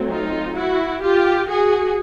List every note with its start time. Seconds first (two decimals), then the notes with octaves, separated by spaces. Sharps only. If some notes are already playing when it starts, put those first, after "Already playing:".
Already playing: F#3 A3 C4
0.09 D#4 F4
0.56 E4 F#4
1.02 F4 G4
1.48 F#4 G#4